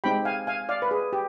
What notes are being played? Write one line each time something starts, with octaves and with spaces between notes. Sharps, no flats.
G#3 C4 D#4 G4 G5 B5
F5 G#5
F5 G#5
D5 F5
B4
G#4
G4